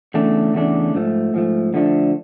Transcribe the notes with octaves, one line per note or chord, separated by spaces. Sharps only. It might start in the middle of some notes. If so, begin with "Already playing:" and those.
E2 C#3 A3 D4
E2 C#3 A3 D4
G#2 F3 A3
G#2 F3 A3
D3 F3 A3 D4